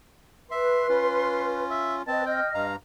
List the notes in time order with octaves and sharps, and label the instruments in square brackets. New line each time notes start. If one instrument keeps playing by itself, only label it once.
[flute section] B4 [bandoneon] E5 [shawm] C6
[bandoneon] C#4 F4
[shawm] E5
[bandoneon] C4 [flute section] B4 D#5 [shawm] A5
[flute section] D#5 F6 [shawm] G5
[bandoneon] G2 A#5 [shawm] F5